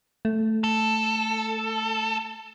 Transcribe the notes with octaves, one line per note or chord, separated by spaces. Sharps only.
A3
A4